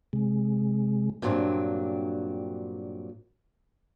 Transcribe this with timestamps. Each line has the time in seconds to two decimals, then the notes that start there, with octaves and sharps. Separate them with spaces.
0.13 C3 G#3
1.22 G2 A#2 F#3 C4 D4